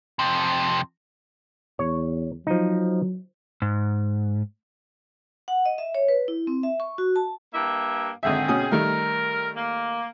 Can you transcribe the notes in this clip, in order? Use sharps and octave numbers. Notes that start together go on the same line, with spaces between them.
F2 C3
E2 C#5
F3 F#3 D#4
G#2
F#5
D#5
E5
C#5
B4
E4
C4
E5
C#6
F#4
A5
G2 A#3 E5
G#1 D3 C4 G#4 E5
B2 C#4 D#6
D#3 G3 A3 A#4
A#3